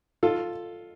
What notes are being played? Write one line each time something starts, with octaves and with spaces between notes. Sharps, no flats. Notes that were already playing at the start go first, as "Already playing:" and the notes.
F4 A4